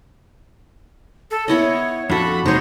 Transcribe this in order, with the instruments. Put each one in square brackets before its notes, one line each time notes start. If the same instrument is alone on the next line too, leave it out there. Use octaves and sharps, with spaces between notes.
[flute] A4
[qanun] B3 E4 D#5 [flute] C#5
[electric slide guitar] F2 A4 [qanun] D4 F#4 [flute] B5
[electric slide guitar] E2 C3 G#3 [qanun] D#4 C#5 [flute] C5